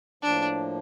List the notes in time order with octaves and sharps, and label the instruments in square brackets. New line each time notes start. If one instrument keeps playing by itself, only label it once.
[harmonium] A2 F3 A#3 [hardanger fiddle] D4